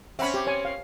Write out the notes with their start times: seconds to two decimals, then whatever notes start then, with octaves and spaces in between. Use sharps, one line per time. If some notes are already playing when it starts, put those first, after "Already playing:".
0.19 C4 C#4 E5 F#5 B5
0.34 G4
0.47 C#5 G#5
0.65 F5